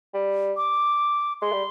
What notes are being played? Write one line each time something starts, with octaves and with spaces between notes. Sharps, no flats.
G3
D6
G#3 C6
G3